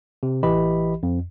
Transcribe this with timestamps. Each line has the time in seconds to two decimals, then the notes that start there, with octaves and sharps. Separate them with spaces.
0.23 C3
0.43 A1 E3 G4 D#5 B5
1.03 F2